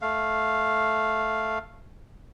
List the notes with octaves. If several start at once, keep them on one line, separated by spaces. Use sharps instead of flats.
A3 F5